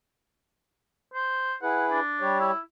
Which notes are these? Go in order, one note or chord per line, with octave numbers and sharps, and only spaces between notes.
C5
E4 G#4 B4 F#5
D4
G3 G4 C#5
E4